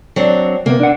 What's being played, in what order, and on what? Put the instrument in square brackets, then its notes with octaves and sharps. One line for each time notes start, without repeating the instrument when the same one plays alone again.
[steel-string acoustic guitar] F#3 C4 D4
[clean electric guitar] C3 B3 [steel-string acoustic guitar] A#3
[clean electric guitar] D4 F#5